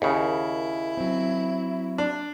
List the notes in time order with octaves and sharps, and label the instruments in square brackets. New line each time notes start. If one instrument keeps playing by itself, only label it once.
[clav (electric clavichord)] D#2 C#3 [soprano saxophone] E4 [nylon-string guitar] G#4 A#4
[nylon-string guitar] F#3 C4
[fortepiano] D4